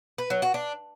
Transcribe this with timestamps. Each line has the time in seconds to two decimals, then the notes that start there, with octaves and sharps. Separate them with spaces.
0.18 B4
0.30 F#3
0.42 F#4
0.54 D4